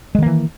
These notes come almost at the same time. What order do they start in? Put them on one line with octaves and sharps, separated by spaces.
G#3 D#3 A#3 E3